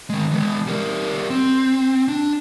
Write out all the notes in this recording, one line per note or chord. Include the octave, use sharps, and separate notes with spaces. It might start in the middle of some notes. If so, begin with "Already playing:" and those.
D#3 G#3
E3 G#3
G3 A#4
C4
D4